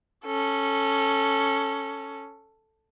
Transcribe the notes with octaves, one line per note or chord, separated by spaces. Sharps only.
C#4 A4